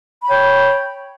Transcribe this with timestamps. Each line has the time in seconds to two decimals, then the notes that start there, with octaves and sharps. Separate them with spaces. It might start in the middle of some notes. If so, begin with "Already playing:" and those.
0.24 B5
0.27 C#5
0.30 G5